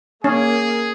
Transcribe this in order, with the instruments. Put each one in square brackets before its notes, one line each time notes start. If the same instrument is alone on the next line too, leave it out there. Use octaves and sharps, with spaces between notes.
[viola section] A#3 [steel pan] C#4 [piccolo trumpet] G#4